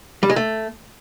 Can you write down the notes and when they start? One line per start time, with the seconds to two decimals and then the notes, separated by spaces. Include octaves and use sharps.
0.23 G3
0.30 G#3
0.36 A3